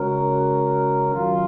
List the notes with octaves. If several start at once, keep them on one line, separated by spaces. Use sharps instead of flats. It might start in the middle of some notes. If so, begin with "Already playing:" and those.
Already playing: C#3 G#3 C#4 F#4 A#4
F#2 D#3 F#3 C#4 F4